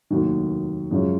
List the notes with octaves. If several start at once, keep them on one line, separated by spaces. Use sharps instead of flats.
F1 D#2 D#3 F#3
F#2 C#3 F3 G#3 C#4